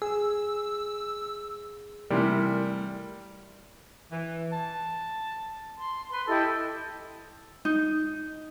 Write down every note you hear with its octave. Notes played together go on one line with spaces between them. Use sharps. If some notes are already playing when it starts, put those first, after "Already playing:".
G#4 E6
A2 C3 E3 G3 A#4
E3
A5
C6
B4 C6
E4 G4 A4 D#5
D#4